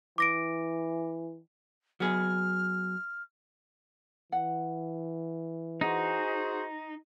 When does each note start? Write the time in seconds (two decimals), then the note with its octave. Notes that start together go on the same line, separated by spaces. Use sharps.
0.18 E3 D6 A#6 D7
2.00 F#3 B3 G#4 F6
4.32 E3 F#5
5.81 D#4 F#4 G#4 C5